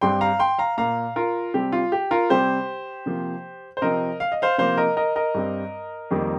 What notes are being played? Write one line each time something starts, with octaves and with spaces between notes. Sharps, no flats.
G2 G3 C4 G5 C6
F5 A#5
G5 C6
F5 A#5
A#2 A#3 F5 A#5
F4 A#4
C3 G3 C4 G4
F4
G4
F4 A#4
C3 G3 C4 G4 C5
C3 F3 A#3
C5
C3 F3 C4 A#4 D#5
F5
D#5
C5 F5
C3 F3 A#3 C5 F5
A#4 D#5
A#4 D#5
A#4 D#5
G2 G3 C4
F2 D#3 G3 A#3